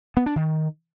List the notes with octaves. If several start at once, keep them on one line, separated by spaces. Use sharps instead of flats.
B3
D4
D#3